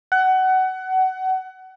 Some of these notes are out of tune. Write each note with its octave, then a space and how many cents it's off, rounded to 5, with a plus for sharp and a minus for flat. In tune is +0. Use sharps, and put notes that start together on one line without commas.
F#5 +25